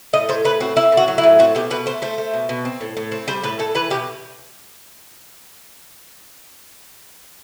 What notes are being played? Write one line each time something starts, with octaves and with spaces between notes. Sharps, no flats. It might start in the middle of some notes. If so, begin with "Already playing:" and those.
A2 D#5
A2 C5
A2 B4
C4 F#4
C4 E4
A2
F#4
F#3
E4
A2
C4 F#4
B2 G4
B2 B4
A3 C5
A3 C5
A3
B2
B2
C4
A2
A2
C4
G3 C5
A2 B4
A2 A4
E3 B4
B2 G4